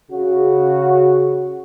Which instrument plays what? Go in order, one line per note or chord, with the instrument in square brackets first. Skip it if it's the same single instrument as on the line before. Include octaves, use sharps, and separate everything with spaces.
[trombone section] C#3 F#4